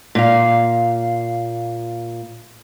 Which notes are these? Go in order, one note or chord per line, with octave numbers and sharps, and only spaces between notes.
A#2 F5